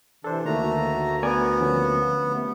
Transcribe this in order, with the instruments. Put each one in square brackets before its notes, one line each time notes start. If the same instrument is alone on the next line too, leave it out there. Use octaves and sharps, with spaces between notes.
[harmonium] C3 E3 [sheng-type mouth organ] D4 [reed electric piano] A4 C5
[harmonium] D2 A#3 F#4 [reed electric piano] D#3 [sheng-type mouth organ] A3 A#5
[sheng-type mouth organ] B3 [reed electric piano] A#4 D5 G#5
[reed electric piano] D3 F3 C#4
[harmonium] C3 A3